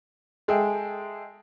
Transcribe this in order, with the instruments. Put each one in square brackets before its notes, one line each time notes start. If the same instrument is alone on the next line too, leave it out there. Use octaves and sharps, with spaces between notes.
[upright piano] G#3 G#4 A4 E5 G5